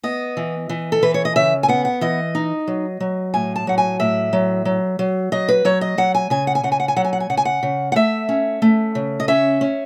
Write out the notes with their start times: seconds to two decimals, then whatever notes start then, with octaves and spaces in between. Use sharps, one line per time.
0.03 B3 D#5
0.37 E3
0.69 E3
0.92 A4
1.02 E3 B4
1.14 C#5
1.25 D#5
1.36 C#3 E5
1.63 G#5
1.68 B3 F#5
1.85 F#5
2.01 E3 D#5
2.35 D#4
2.67 F#3
3.00 F#3
3.34 A2 G#5
3.56 A5
3.67 F#3 F#5
3.78 G#5
4.00 A2 E5
4.33 F#3
4.65 F#3
4.99 F#3
5.32 F#3 D#5
5.48 B4
5.65 F#3 C#5
5.81 D#5
5.98 F#3 F#5
6.14 G#5
6.30 C#3 G#5
6.47 F#5
6.55 G#5
6.63 C#3 F#5
6.72 G#5
6.80 F#5
6.88 G#5
6.96 F#3 F#5
7.05 G#5
7.13 F#5
7.20 G#5
7.30 C#3 F#5
7.37 G#5
7.45 F#5
7.63 C#3
7.92 F#5
7.96 A3 E5
8.29 C#4
8.62 A3
8.95 C#3
9.20 D#5
9.28 C#4 E5
9.61 C#4